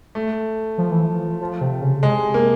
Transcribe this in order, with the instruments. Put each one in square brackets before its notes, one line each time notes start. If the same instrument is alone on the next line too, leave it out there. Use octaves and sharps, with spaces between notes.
[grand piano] A3
[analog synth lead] F3
E3
F3
F3
C3
C#3
[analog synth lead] C3 [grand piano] G#3
[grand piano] A#3